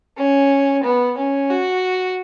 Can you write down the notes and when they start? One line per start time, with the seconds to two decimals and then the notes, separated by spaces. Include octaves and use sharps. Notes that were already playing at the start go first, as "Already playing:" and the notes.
0.17 C#4
0.83 B3
1.17 C#4
1.50 F#4